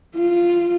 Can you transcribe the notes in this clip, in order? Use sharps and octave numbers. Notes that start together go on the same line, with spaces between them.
F4